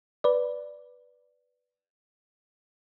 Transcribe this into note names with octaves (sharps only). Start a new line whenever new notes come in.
B4 D5